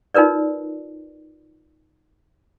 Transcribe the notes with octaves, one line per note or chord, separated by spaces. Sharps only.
D#4 F4 A#4 B4 D5